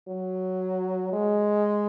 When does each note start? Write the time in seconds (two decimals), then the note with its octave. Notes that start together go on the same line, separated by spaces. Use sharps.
0.08 F#3
1.13 G#3